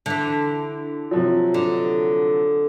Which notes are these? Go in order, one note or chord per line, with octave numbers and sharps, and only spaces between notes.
D3 E3
C3 F3 F#3
D3